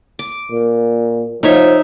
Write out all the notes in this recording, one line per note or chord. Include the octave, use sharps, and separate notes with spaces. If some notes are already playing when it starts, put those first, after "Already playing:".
D6
A#2
F3 D#4 C#5 E5